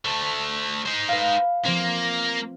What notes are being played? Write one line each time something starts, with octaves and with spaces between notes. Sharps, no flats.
D2 A3
D#4 C5
B4 F5
F3 A#3 C4